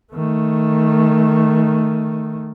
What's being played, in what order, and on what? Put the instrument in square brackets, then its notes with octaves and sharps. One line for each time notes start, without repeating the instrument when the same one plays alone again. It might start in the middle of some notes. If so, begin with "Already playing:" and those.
[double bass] D#3 A3